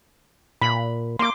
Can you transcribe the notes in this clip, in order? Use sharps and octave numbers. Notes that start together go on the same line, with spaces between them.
A#2 B5
A#3 C6 D6